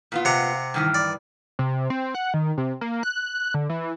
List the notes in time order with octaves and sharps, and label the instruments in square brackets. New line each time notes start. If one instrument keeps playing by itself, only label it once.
[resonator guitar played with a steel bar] A#2 B3 F4
[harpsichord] C3 F#5 A#5
[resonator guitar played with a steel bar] G2 D#3 E3
[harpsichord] D5
[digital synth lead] C3
C4
F#5
D#3
C3
A#3
F#6
D3
E3